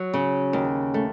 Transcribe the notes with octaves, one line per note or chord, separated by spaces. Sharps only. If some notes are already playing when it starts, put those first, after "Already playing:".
Already playing: F#3
C#3
D#2
A3